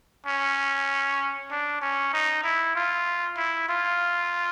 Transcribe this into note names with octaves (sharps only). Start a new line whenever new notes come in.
C#4
D4
C#4
D#4
E4
F4
E4
F4